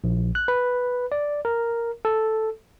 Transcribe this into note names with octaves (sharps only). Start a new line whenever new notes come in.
A#1
F#6
B4
D5
A#4
A4